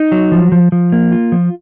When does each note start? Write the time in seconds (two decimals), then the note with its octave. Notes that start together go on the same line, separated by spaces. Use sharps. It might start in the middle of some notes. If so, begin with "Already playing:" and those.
Already playing: D#4
0.12 F#3
0.32 F3
0.52 F3
0.72 F3
0.92 A#3
1.12 F4
1.32 F3